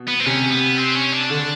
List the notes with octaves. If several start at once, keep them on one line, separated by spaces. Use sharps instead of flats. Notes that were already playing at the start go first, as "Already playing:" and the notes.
Already playing: B2
B3
C4
C3 C#4
B3
C4
C#4
D4
D3